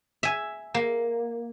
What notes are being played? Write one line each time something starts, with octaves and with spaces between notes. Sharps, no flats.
E5 G#5
A#3